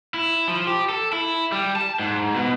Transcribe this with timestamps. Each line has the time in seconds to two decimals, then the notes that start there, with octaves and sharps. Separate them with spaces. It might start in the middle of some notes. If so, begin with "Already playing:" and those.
0.14 E4
0.48 F3
0.67 G4
0.89 A4
1.13 E4
1.52 G3
1.76 A5
1.99 G#2
2.36 B2